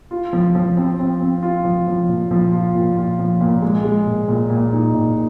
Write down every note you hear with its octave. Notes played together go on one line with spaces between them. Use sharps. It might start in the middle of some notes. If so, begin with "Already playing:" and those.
F4
F3
F3
C4
C4
C4
F4
F3
F3
A#2
F3
F4
A#2
F4
F3
A#2
G#3
G#3
A#2
A#2
A#2
D#4
A#2